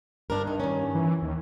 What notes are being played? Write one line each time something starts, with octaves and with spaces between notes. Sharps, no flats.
G2 D4 A#4
D#4
D#3 C#4
E3
D#2